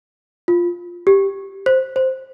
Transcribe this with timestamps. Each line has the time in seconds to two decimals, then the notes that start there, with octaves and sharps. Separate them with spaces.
0.48 F4
1.07 G4
1.66 C5
1.96 C5